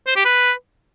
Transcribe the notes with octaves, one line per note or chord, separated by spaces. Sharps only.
C5
G4
B4